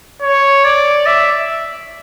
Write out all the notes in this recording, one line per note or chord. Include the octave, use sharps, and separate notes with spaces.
C#5
D5
E5